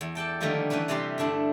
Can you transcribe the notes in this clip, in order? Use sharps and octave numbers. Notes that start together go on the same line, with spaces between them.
E2
A4 D5 G5 A5
D3 D#3 F3 G3 A3 A#3
E3 A3 C#4 D4 B4
C3 E3 G3 C4 G4 C6
G2 D3 A3 D4 E4